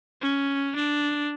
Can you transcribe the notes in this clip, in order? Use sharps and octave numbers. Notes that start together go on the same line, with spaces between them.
C#4
D4